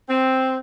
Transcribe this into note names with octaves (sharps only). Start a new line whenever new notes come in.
C4